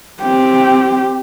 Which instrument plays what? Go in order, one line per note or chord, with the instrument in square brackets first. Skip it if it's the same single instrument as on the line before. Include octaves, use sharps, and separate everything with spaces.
[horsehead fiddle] C4 G4